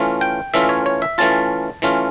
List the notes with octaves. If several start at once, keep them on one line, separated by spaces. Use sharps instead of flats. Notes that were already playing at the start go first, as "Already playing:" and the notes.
Already playing: E3 A3 C#4 F4
G5
E3 A3 C#4 F4 E5
C#5
C#5
E5
E3 A3 C#4 F4 A5
E3 A3 C#4 F4